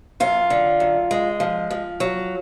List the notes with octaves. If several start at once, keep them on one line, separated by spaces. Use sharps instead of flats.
F#2 F4
D3
F#2
G#3
F3
F3
F#3